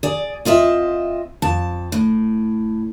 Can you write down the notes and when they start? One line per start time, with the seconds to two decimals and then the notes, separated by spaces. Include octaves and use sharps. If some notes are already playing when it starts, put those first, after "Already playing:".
0.03 G#4 D5
0.45 C4 F4 D#5 E5
1.42 F2 A5
1.92 A2